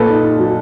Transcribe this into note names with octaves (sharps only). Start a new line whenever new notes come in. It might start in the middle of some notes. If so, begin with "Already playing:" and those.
Already playing: A#2 A4 B4
D#4
D#4
F#3